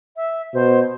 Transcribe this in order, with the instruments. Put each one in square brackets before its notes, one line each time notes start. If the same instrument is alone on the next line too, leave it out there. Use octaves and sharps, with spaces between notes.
[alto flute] E5
[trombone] B2 [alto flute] C5